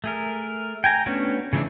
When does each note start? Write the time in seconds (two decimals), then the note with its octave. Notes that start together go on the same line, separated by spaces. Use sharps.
0.04 A3 G#4 A#4
0.84 G5 G#5 A#5
1.06 A3 B3 C#4 D4 F#4
1.53 C#3 E3 A3 C#4 D4